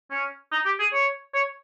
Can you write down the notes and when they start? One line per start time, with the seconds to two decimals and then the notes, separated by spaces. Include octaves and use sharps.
0.11 C#4
0.52 D#4
0.66 G4
0.80 G#4
0.93 C#5
1.34 C#5